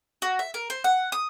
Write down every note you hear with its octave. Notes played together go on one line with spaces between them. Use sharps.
F#4
E5
A#4
C5
F#5
D#6